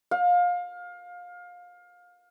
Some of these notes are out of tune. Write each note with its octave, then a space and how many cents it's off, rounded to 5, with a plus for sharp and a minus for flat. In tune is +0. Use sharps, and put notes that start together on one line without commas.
F5 +25